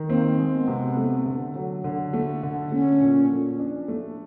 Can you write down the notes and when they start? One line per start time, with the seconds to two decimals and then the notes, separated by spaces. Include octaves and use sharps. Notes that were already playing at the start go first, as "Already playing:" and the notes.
Already playing: D#3
0.09 A#3 C4
0.38 G#3
0.53 B3
0.68 C3
0.97 A3
1.26 D3
1.55 F#3
1.84 D3
2.13 A3
2.43 D3
2.72 A3 C#4
3.00 A#2
3.30 F3
3.59 D4
3.88 A3